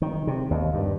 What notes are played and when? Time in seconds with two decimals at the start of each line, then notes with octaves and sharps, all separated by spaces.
0.02 D#3
0.27 C3
0.51 D#2
0.74 G2